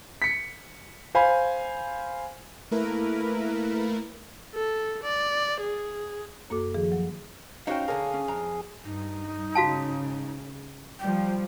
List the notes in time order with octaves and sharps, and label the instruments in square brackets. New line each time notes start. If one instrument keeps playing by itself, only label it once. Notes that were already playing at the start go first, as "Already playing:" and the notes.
[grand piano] B6 C#7
C5 F5 G#5 B5
[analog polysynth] A3 A#3 E4 A#4 B4
[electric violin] A4
D5
G#4
[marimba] F#2 A#3 F#4 A4 D6
D#3 F3 G#4
F#3
[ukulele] C#4 F#4 G5 [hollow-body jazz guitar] D#4 C5 C#5 [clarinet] F5
[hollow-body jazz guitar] D3 A#4 [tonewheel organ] G#4 [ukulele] C#5
[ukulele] C#4
[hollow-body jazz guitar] F2 [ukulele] A#5
[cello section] G2 [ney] D#4
[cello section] G#2 C#3 [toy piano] F#4 F5 A5
[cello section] F3 G3 [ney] G5